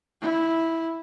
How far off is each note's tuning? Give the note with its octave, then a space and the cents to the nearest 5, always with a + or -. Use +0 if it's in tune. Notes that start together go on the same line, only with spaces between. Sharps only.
E4 -10